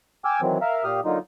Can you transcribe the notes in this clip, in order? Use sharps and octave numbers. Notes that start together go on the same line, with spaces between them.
G5 G#5 D6 E6 F6
D#3 E3 F#3 C4
A#4 E5 F5
A#2 G4 F5 D#6 F6
D3 F#3 A#3 D#4 F4